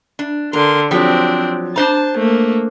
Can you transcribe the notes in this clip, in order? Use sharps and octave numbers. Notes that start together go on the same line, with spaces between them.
D4
D3 A#4 C6
F3 F#3 C4 D4 G4
D4 C5 A5 A#5
A3 A#3